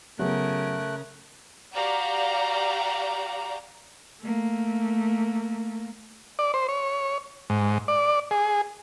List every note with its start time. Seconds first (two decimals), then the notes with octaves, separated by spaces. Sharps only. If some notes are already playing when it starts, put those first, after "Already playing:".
0.19 C#3 F#3 A3 B3 G#4 A#4 F#6
1.74 F#4 G4 D5 F5 A#5
4.22 A3 A#3
6.39 D5
6.54 C5
6.69 C#5
7.50 G#2
7.88 D5
8.31 G#4